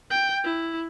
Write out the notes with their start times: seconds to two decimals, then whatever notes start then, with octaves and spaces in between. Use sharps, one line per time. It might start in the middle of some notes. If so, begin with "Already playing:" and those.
0.10 G5
0.44 E4